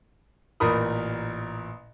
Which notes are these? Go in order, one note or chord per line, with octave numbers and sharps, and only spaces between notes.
A1 A#2 A#4 B5 D#6